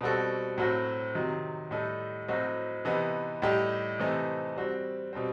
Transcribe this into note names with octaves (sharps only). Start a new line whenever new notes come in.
B2 G3 C4 F#4 A4
A2 F#3 C4 F#4
C3 D#3 F#3
A2 G3 D#4 A4
A2 F#3 C4 D#4 F#4
C3 E3 B3 D#4
A2 G3 D#4 G4
C3 E3 A3 C4 D#4
G3 C4 F#4
B2 G3 C4